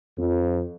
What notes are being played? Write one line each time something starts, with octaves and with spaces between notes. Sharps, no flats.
F2